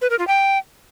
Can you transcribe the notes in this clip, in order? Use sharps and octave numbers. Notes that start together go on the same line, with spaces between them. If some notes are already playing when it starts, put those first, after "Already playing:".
B4
A#4
F4
G5